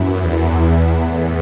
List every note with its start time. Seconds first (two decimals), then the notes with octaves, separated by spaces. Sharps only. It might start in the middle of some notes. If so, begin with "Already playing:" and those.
Already playing: F#2 E3 B3 E4
0.25 E2
0.90 A2 E3 B3